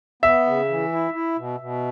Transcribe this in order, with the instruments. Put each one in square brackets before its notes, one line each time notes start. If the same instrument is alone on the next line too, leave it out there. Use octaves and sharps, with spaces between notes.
[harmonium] B3 [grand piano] E5
[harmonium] C#3
E3
E4
E4
B2
B2